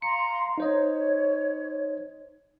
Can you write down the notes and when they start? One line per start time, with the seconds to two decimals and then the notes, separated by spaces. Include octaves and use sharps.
0.02 F5 A#5 C6 C#7
0.58 D#4 C5 C#5 D#5